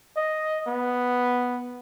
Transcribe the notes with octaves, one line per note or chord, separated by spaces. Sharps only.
D#5
B3